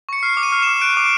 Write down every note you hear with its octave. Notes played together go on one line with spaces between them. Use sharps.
C#6 C#7
F6 C7
D6
D#7
F6
D6 E7
F#6 D7
D6